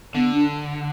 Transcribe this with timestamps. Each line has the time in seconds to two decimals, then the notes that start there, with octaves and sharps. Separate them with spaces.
0.15 D3 B3
0.34 D4